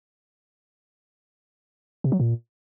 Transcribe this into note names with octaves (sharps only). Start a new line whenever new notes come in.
C3
F#3
A#2